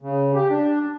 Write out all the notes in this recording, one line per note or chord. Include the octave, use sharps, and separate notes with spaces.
C#3
G4
D4